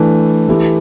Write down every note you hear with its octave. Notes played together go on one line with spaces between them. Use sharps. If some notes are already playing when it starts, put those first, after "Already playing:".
Already playing: E3 A3 D4
E3 A3 E4 G4